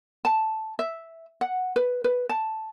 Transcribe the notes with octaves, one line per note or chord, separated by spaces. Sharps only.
A5
E5
F#5
B4
B4
A5